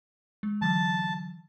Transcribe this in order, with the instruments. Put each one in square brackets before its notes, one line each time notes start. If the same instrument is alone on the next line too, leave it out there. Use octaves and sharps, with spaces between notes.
[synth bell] G#3
[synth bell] D3 E3 F#3 [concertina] A5